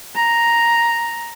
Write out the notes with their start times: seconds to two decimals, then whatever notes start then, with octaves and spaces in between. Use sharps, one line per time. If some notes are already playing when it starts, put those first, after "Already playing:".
0.16 A#5